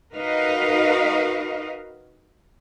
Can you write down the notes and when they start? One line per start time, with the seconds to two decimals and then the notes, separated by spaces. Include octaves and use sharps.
0.15 D#4 F#4 A#4 B4 D#5 F5